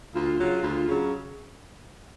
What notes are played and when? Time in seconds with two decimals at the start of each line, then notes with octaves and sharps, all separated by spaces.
0.14 D2 F4
0.38 C#3 F#3
0.63 D2
0.87 C#3 F#3